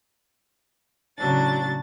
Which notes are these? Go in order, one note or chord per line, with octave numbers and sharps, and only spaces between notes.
A2 C#3 F#3 D4 A6